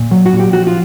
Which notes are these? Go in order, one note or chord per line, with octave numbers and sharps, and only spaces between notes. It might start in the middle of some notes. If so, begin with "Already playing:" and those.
Already playing: A#2
F#3
F#4
A#2
G4
F3 F#4
F4